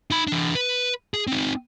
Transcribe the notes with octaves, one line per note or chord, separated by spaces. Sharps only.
D#4 B5
E3 D4
B4
G#4
C4 D#4